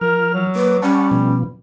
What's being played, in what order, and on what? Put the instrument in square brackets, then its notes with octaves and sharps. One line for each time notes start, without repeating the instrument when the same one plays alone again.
[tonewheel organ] F3 F6 [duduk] A#4
[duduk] F#3
[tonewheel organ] A#3 D6 [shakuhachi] B4
[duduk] G3 [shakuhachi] C#4 [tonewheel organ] F#5 A5 C#6
[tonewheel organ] B2 F3 B3